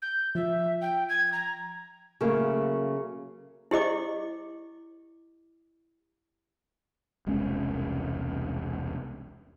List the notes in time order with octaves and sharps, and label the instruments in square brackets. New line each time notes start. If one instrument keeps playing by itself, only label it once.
[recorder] G6
[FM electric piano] F3 [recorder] E5
[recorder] G5
G#6
A#5
[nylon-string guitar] C#3 F#3 A3 A#3
[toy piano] E4 G4 D#5 D6
[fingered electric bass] E1 C2 G#3 C#4